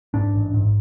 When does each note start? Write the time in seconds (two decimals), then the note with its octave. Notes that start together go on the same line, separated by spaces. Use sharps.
0.14 G#2 D4
0.34 A1
0.54 G#2